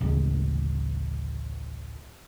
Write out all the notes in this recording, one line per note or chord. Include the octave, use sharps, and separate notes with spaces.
A1 D2 C#3 G#3